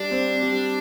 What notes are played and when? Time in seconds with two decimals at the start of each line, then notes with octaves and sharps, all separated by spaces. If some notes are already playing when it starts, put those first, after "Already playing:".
Already playing: G3 D4
0.11 C4
0.43 G3